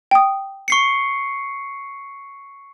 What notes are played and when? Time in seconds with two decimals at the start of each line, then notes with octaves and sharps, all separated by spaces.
0.11 G5 D#6
0.68 C#6 C7 C#7